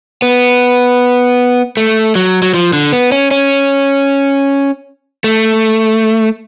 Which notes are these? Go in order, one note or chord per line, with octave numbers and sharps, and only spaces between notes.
B3
A3
F#3
F#3
F3
D3
B3
C#4
C#4
A3